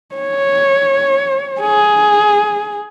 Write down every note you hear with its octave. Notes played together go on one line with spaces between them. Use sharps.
C#5
G#4